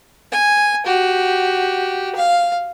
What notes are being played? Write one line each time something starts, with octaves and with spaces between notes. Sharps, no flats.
G#5
F#4 G4
F5